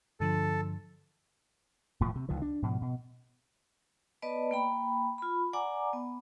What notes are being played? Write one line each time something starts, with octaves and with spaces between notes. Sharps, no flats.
G2 D3 F3 A4
D#1 A2 F3
C3
C#2 D3 D#3 F3
D4
G#2 B2 F3
B2
B3 B4 D5 D#5 A5
A#3 G5 B5
F4 B5
D5 F#5 G#5 A#5 D6
B3